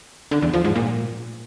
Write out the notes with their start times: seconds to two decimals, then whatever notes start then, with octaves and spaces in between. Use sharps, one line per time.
0.31 D3
0.42 E2
0.53 F3
0.64 G#2
0.76 A#2